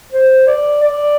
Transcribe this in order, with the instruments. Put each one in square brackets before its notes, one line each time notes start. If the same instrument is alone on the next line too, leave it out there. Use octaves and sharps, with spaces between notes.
[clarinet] C5
D5
D5